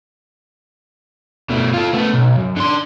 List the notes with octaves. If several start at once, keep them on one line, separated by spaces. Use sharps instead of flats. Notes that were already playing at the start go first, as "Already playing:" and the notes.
B2 A3
F4 A4
A3 B3
B1
F#2
D3 C6